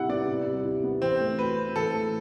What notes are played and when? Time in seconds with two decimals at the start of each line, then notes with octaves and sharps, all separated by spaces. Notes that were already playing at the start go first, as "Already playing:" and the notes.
Already playing: C3 G3 E4 F#5
0.09 B3 D5
0.28 C3
0.46 G3
0.65 E4
0.84 B3
1.02 E3 C4
1.20 A3
1.38 F#4 B4
1.58 C4
1.76 E3 A4
1.94 A3